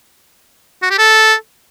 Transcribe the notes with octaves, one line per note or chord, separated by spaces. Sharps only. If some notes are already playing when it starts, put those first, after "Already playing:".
F#4
G4
A4